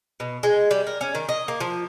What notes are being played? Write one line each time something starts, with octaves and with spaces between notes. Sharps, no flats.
B2
G#3
G3
A#4
C#4
D#3
D#5
A#3
F3